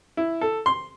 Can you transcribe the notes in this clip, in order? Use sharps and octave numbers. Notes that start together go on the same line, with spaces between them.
E4
A4
C6